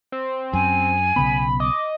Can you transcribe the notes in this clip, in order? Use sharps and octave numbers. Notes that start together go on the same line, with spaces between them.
C4
F#2 G#5
B1 C#3 B3 B5
D#5 D6